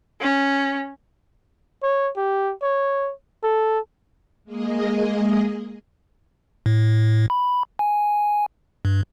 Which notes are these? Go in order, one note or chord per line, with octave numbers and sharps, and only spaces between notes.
C#4
C#5
G4
C#5
A4
G#3 A#3 G#4 D#5
A2
B5
G#5
G2